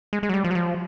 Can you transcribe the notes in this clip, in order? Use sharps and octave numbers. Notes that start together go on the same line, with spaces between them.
G#3
G#3
F#3
G3
F3
F#3
F3